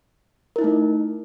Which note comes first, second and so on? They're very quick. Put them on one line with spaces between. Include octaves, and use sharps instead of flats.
A#4 E4 D#4 A3